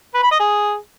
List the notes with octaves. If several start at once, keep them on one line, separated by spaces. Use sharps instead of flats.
B4
B5
D#5
G#4